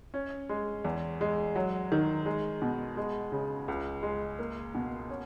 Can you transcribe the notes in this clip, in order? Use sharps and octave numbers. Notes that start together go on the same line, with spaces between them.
C#4
G#3
E2
G#3
F#3
D#3
G#3
B2
G#3
C#3
C#2
G#3
A#3
B2
C#4